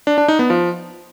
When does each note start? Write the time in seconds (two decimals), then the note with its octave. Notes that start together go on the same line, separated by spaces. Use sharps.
0.07 D4
0.18 D4
0.28 D#4
0.39 B3
0.50 F3